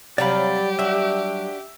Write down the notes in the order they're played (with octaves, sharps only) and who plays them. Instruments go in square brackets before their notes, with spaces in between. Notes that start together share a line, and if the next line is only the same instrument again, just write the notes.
[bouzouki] C3 F5 [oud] F#3 G3 [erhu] G4 [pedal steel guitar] D5 B5
[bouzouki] D4 F#4 [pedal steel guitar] E5